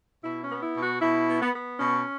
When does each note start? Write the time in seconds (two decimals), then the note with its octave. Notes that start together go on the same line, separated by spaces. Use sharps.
0.24 B2 E4
0.43 C#4
0.50 B3
0.63 E4
0.76 B2
0.82 F#4
1.01 B2 E4
1.28 B3
1.41 B3
1.54 B3
1.79 B2 C#4